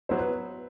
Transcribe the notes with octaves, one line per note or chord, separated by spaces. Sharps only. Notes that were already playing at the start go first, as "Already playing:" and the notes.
F#3 B3 E4 C5
B4